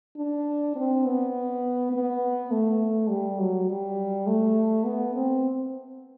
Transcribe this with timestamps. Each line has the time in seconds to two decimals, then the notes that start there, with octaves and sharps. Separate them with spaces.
0.17 D4
0.76 C4
1.05 B3
1.93 B3
2.51 A3
3.09 G3
3.39 F#3
3.68 G3
4.27 A3
4.85 B3
5.15 C4